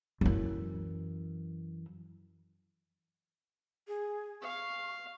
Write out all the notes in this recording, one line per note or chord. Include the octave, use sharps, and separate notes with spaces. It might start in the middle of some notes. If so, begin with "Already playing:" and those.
F#2 E3
G#4
F5 C#6